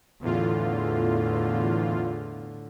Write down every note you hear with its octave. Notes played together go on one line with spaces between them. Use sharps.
E2 A2 D3 F4